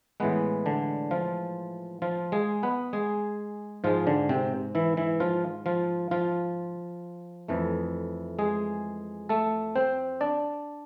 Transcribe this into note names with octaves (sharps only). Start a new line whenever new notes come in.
A2 E3 G#3 B3 B4
D3 D4
F3 F4
F3 F4
G#3 G#4
B3 B4
G#3 G#4
G#2 F3 G#3 F4
D3 D4
C3 C4
E3 E4
E3 E4
F3 F4
F3 F4
F3 F4
F2 E3 A3
G#3 G#4
A3 A4
C4 C5
D4 D5